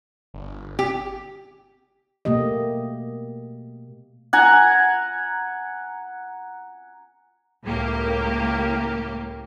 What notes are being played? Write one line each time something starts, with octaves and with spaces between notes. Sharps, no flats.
G1
G4
B2 A3 A#3 G4 D#5
F#5 G#5 A#5
C#2 A2 A#3 G4